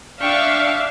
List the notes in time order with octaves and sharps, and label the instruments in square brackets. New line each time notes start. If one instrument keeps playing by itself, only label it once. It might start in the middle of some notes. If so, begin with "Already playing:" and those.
[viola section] D4 E5 F5 [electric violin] G5 C#6